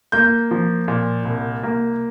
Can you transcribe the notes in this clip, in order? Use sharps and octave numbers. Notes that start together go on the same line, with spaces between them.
A#3 G6
F3
A#2
C2
A#3